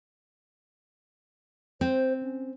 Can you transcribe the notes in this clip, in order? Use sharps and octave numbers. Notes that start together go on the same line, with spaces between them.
C4 C5
C#4